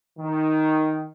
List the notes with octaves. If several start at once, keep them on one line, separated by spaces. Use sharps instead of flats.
D#3